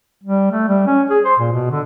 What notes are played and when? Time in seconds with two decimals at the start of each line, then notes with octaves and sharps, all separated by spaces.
0.24 G3
0.52 A3
0.68 G3
0.87 C#4
1.10 G#4
1.25 C5
1.39 A#2
1.52 B2
1.70 D3